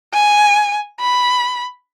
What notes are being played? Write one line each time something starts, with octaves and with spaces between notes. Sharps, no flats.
G#5
B5